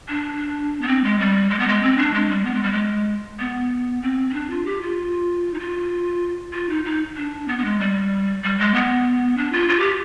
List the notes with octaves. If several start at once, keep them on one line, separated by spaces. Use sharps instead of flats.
D4
B3
C4
G#3
G3
G#3
B3
G#3
C4
D4
G#3
G3
B3
G#3
G3
G#3
B3
C4
C4
D4
F4
G4
F4
D#4
F4
F4
D#4
D#4
D4
B3
B3
G#3
G3
G3
G#3
B3
D4
F4
F4
G4